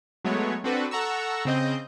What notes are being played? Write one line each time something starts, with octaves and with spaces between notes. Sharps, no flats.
F#3 G#3 A3 B3 C#5
C4 D4 F#4 A4 B4
A4 F#5 A#5 C#6 E6
C#3 C4 D#5 G6